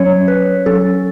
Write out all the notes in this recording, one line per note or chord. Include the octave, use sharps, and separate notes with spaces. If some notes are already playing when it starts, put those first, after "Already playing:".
Already playing: F#3 C#4 C#5
B4
F#3 C#4 A4